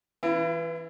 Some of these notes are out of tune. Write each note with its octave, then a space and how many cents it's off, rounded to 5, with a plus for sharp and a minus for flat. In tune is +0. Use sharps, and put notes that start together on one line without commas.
E3 +0 B3 +0 E4 +45